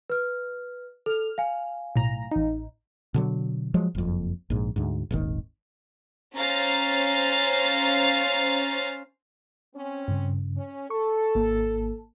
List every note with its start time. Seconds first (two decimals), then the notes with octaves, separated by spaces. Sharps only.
0.10 B4 F6
1.06 A4 F6
1.38 F5 G#5
1.96 B1 A2 A#5
2.31 A1 D#4
3.14 B2 D3 F#3
3.74 F3 F#3 G#3
3.95 F#1 F2
4.50 A#1 G#2
4.76 D2 G#2
5.11 D#1 G#1 D#3
6.35 C#4 C5 F5 A#5 A6
9.75 C4 C#4
10.08 G2 C#3
10.57 C#4
10.90 A4 C#6
11.35 G#1 A#3